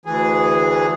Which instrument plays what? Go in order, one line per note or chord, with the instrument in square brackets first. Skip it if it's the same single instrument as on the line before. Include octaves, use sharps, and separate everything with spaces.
[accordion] D2 E3 G#4